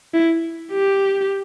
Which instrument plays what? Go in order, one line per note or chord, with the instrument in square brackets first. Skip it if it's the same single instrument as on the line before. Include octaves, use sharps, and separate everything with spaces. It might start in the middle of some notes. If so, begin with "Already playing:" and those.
[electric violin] E4
G4